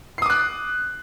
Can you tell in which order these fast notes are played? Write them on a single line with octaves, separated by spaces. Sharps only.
C7 D#6 D6 F#6